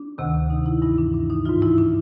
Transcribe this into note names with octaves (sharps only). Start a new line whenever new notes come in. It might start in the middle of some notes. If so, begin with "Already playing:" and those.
Already playing: D4
D2 C3 D#3
D#4
E4
G2 E3 E4
D4
D4
D#4
G#2 E3 F4
E4
D4